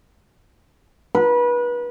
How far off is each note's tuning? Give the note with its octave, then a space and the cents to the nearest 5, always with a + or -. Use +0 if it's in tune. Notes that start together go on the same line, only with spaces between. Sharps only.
B4 -30